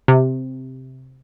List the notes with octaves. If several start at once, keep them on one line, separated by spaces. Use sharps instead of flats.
C3